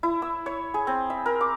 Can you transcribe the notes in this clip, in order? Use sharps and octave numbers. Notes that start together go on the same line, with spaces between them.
E4
E6
C#5
G#4
C4
E5
A#4
D6